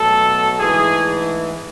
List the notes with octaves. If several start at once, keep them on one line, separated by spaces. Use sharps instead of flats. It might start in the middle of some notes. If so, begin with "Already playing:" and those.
Already playing: B2 F#3 A3 A4
G#2 E3 A3 G#4